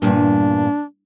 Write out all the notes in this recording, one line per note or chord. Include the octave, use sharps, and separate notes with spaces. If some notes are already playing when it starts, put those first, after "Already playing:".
E2 G2 A#2 D4